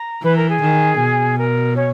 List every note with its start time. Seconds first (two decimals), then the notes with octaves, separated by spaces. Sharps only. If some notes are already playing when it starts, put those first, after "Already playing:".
Already playing: A#5
0.22 E3 B4 B5
0.35 A#4 A#5
0.48 G#4 G#5
0.61 D#3
0.99 B2
1.38 A#4
1.75 C#4 C#5